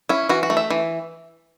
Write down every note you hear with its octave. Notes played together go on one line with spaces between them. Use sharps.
C#4 E4
E3 F#4
F#4
A3
E5
E3